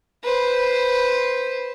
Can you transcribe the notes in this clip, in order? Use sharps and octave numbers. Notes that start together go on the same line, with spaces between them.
B4 C5